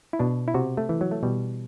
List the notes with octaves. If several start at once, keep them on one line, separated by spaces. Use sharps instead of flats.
E4
B2 D4
E4
C3 F#4
A3
E3
F#3
A3
B2 G3